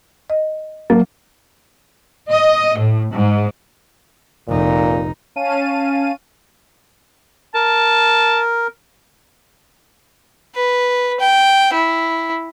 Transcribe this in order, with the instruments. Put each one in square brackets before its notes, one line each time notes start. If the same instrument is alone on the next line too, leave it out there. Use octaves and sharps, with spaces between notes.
[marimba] D#5
[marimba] F#3 [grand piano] A#3
[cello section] D#5
A2
G#2
[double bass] F1 D#4 [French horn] A#2
[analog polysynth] C#4 F5 A5 D#7
[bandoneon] A#4 [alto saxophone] A5
[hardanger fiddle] B4
G5
E4